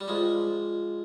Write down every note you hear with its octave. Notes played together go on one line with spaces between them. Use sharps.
G3
F3 G#3